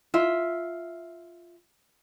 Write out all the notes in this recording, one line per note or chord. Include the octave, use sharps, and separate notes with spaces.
F4 E5